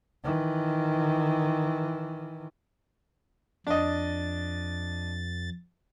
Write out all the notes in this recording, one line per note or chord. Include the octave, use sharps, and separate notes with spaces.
D#3 E3
F2 D4 D#5 A6